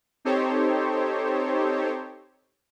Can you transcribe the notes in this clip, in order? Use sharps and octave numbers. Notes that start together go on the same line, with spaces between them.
C4 D#4 G4 A4 C5 C#5